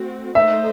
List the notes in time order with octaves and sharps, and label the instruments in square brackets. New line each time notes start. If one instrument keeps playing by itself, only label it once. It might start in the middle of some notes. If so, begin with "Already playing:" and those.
Already playing: [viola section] A3 C4 F#4
[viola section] A3 D#4 A4 C5 [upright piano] E5